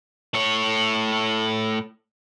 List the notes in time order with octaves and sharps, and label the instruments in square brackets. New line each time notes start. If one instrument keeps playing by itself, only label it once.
[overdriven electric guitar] A2 C#5